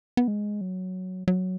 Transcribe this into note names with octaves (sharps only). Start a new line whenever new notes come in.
B3
G#3
F#3
F#3